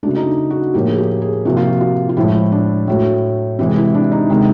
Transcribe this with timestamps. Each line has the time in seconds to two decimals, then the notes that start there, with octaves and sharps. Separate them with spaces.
0.03 C#3 F#3 A3 D4
0.16 D#4
0.26 D4
0.50 F#4
0.74 A2 F3 A#3 G4
0.88 G#4
0.98 G4
1.22 G#4
1.45 C3 F3 A#3 F#4
1.57 F4
1.67 F#4
1.81 F4
2.09 F4
2.17 A2 F3 G#3 E4
2.52 D4
2.88 A2 F#3 A3
3.59 C3 E3 G#3 E4
3.76 E4
3.94 D4
4.12 D#4
4.30 C3 D#3 G#3